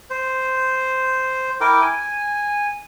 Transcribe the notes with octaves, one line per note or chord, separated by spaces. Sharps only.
C5
E4 A#4 G5 D6
G#5